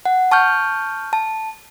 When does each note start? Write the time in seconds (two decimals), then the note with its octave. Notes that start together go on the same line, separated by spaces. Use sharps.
0.05 F#5
0.31 A5 C#6 F6 G6
1.13 A5